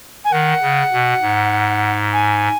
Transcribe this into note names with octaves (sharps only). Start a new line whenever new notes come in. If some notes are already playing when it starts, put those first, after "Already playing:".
G#5
D#3 F#5
C#3
B2
G#2
G#5